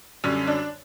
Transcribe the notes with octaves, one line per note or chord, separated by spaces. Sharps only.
F#2 D3 G3 C#4
D4